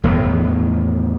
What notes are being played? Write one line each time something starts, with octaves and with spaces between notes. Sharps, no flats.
E2 A2 D#3 B3